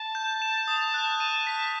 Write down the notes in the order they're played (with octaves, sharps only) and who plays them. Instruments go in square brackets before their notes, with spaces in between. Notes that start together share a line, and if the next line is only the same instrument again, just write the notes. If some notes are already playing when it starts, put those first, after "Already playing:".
Already playing: [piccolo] A5
[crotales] G6
E7
D#6
F#6
D#7
B6